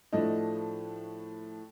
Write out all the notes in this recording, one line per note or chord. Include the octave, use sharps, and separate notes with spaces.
A2 F3 A3 D4 D#5